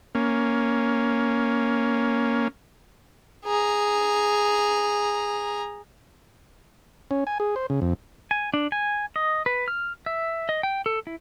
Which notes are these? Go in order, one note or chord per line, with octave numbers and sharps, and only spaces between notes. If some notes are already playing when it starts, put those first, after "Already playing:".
A#3 C#4
G#4 A#5
C#4
G#5
G#4
C5
C#3
F2
G#5
D4
G#5
D#5
B4
F6
E5
D#5
G5
A4
E4